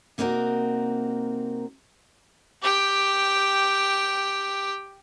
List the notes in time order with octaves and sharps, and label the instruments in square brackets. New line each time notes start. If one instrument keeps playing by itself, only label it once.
[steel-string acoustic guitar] C3 A#3 C4 D#4 F#4 A#4
[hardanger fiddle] G4 G5